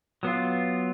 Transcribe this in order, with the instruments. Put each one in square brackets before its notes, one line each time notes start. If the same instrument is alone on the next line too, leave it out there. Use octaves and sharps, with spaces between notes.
[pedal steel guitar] F#3 B3 F4